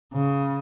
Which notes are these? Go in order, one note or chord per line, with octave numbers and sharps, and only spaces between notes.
C#3